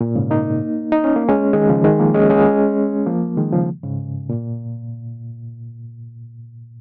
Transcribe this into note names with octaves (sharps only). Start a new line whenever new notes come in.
A#2
G#2 C#3
A#3 D#4
D#4
C#4
A#3
G#3 C#4
D#3 G#3
C#3 F3
D#3 G#3
F3 A#3
G#3 C#4
G#3 C#4
F3 A#3
D#3 G#3
C#3 F3
G#2 C#3
A#2